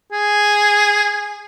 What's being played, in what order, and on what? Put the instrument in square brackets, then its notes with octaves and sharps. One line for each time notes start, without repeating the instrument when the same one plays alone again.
[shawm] G#4